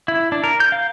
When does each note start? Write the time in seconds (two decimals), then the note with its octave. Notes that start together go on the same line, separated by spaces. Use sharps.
0.08 E4
0.32 D4
0.44 A#4
0.60 G6
0.72 F5